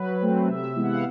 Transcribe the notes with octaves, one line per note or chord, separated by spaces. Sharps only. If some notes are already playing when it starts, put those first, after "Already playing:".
Already playing: F#3 B4
A3 C4
C3 E5
E3 G#3 B3 E4
F#5
F5